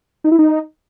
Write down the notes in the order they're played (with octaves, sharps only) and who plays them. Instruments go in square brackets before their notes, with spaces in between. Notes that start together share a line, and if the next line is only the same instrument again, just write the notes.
[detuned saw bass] D#4
E4
D#4